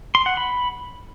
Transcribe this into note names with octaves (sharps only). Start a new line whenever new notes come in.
C6
F#5
B5